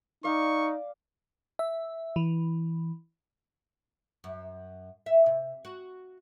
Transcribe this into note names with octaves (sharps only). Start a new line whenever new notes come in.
D#4 D5 F5 C#6
E5
E3
F#2
E5
C3
F#4